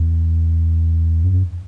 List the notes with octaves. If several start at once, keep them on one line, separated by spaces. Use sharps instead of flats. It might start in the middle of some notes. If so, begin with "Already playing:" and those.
Already playing: E2
F#2